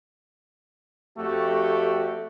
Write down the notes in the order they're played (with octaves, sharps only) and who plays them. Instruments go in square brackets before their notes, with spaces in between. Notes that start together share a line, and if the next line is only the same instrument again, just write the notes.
[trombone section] F2 A3 F#4 G4 A4